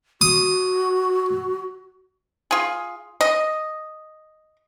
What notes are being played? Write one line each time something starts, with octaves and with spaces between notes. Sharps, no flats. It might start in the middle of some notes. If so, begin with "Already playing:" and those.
F#4 D#6
F4 G#4
D#5